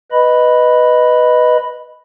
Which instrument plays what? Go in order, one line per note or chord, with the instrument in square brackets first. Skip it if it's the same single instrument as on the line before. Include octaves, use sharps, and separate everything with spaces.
[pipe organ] B4 D#5 B5